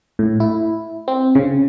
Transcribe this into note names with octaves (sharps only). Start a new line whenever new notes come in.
A2
E4
C4
C#3